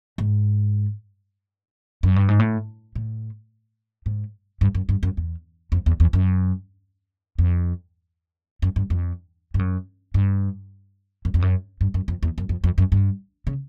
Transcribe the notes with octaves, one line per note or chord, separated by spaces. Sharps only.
G#2
F#2
G2
G#2
A2
A2
G#2
G2
F#2
G2
F#2
E2
F2
E2
E2
F#2
F2
F#2
G2
F2
G2
F#2
G2
F#2
F2
F#2
G2
F#2
F2
E2
F#2
F2
F2
F#2
G2
C#3